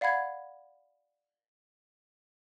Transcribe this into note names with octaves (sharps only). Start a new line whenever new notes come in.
D5 F5 F#5 B5 G#6